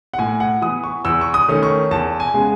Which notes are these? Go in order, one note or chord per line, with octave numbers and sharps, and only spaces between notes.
F#5
A2 G#5
F#5
E3 B3 D#6
C#6
E2 E6
C#6
D#6
D#3 A3 C#4
C#6
E2 A5
G#5
C#3 G#3 B3